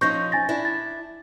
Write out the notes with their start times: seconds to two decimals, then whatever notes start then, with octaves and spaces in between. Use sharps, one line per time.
0.01 F3 C#4 D#4 C#6 G6 A#6
0.32 G#5 A6 A#6
0.49 D4 E4
0.65 A6